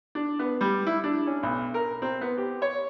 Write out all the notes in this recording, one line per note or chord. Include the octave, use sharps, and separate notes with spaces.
D4
B3
G3
E4
D4
C#4
B1
A#4
C4
B3
G4
C#5